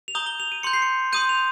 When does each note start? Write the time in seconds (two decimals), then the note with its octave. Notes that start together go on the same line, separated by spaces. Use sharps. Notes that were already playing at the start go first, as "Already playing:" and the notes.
0.08 F7
0.15 A#5 D#6 G6 G7
0.26 G7
0.40 F7
0.52 D#7
0.63 C6 G6 C#7
0.73 C7
0.82 C#7
1.13 C6 D#6 G6 D#7
1.29 F7